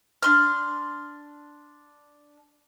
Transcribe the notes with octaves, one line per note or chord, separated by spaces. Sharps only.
D4 C6 F6